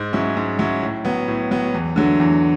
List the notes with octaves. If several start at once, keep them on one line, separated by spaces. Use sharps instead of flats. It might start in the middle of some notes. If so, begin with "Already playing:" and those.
Already playing: G#2
F#3 C#4 E4
G#2
F#3 C#4 E4
A2
F#3 B3
A2
F#3 B3
E2
D3 F#3 A3
E2